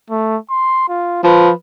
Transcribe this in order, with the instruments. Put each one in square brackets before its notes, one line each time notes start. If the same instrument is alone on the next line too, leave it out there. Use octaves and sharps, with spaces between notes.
[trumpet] A3
C6
F4
[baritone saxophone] F3 [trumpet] B4